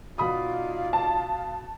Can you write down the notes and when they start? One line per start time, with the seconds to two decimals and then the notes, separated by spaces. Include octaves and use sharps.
0.18 B2 D#4 F4 D5 F5 B5 D#6
0.93 A5